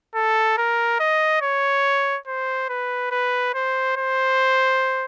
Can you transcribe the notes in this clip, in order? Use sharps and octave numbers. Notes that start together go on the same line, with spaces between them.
A4
A#4
D#5
C#5
C5
B4
B4
C5
C5